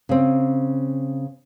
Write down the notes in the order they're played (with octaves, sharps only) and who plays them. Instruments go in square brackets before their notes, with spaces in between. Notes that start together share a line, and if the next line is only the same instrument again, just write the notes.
[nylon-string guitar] C#3 C4